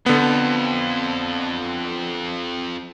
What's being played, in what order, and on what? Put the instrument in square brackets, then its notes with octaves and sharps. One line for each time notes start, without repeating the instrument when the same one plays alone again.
[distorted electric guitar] F2 [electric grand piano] D3 B3